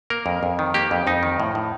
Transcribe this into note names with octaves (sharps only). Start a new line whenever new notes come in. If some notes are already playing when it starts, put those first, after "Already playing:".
A#3 A#4
F2
F2
D#3
A#3 G4
F2
F2 D#4
D#3
A2
A2